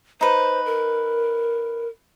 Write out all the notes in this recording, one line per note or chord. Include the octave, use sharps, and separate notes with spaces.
D#4 B4 C5
A#4